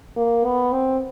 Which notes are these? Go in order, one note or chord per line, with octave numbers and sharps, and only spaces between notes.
A#3
B3
C4